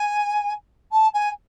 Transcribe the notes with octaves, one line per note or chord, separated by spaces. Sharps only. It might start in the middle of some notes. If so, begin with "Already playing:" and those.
Already playing: G#5
A5
G#5